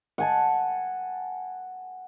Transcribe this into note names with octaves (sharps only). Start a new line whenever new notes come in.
F#5 G#5 A5